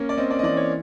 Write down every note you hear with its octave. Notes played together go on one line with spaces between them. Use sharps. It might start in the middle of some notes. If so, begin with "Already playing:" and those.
Already playing: A#3 C#4
D5
C4 D#5
D5
D#5
E3 D5
C#5